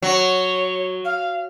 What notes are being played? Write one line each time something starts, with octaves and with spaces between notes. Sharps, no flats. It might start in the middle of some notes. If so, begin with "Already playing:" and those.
F#3 C#5
F5